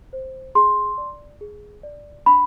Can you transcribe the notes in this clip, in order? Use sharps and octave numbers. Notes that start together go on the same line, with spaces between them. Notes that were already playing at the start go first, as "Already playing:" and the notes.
C5
G#4 C6
D5
G#4
D5
D4 B5